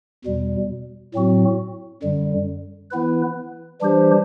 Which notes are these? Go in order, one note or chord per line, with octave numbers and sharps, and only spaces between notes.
E2 B2 G3
A2 F#3 C4 F#4
F#2 D3 G3
E3 B3 E4 B4
E3 G3 D4 G4 C5